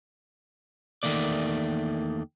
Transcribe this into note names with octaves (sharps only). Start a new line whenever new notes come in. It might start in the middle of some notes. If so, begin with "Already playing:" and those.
E2 D#3 A3 A#3 D5